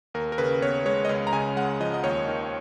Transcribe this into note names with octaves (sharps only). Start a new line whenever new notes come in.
D#2 A#4
A#4
C#3 B4
B3 C#5
G#3 C#5
D#5
C#2 C#5
A#5
C#3 G#5
G#3 F#5
F3 D#5
D#5
D#2 C#5
D#3